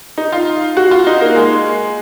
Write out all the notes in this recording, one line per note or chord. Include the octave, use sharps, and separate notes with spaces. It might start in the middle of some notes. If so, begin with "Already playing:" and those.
D#4
F4
F#4
F4
D#4
A#3
G#3